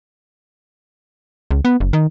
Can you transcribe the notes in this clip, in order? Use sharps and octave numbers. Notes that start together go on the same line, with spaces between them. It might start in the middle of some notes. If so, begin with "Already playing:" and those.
C#2
B3
F#1
D#3